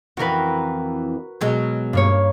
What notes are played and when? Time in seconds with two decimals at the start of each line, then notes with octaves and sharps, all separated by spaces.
0.17 F2 E3 F#4 A#4 B4
1.41 B2 F#3 G#3
1.93 G2 A#3 C#5